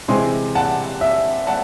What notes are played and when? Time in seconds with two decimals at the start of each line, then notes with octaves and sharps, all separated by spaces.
0.08 C3 E3 G#3 C4 G#5 C6
0.55 F#5 A5
1.01 E5
1.47 F#5 A5